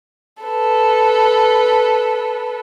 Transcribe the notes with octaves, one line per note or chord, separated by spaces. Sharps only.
A4 B4